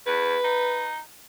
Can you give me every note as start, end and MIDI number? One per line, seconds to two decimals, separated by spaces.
0.07 0.37 40
0.07 0.89 71
0.44 0.99 63